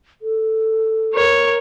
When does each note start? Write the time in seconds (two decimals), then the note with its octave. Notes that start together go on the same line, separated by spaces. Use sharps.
0.22 A4
1.14 A#4 C#5